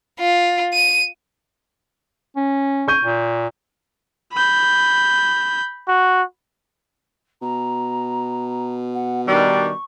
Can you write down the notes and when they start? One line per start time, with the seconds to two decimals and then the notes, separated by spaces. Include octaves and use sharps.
0.20 F4
0.74 D#7
2.36 C#4
2.88 C#6 G6 D#7
3.05 A#2
4.33 B5 G6
5.88 F#4
7.42 B2 A#5
8.94 F#5
9.27 D#3 G3 D4 C#6